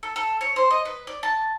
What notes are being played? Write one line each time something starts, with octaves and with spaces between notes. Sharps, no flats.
A4
A4
C#5
C5
D#5
B4
D5
A5